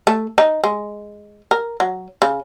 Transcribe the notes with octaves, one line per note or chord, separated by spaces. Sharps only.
A3
D#4
G#3
A#4
F#3
C#3